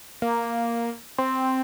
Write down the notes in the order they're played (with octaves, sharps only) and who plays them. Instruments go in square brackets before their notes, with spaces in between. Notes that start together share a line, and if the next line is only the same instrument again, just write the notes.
[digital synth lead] A#3
C4